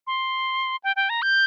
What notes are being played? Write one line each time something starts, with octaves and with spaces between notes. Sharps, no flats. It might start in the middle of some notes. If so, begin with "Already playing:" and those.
C6
G5
G5
A#5
G6